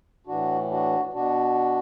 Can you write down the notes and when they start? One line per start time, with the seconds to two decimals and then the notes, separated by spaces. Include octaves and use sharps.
0.26 A2 E3 D4 F#4
0.70 D4 F#4
1.13 B2 D4 F#4